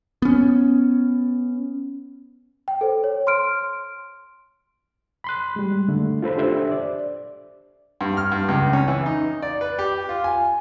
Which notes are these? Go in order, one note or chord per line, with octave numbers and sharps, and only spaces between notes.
B3 C#4
G5
A4 C5
C#5
C6 F6 D7
B5 C6 F#6
G3 G#3
D3 A3
F4 A4 C5 B5
D4 G4 A4 C5 E5
D5
G2
F6
G2
C#2
C#4
E3
D#4
D5
B4
G4
F4
G#5